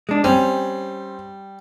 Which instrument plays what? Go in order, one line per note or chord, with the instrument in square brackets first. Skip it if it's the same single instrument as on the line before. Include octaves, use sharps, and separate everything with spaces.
[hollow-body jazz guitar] G#3 D4
[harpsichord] G3 [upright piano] C4 [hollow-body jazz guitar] C#4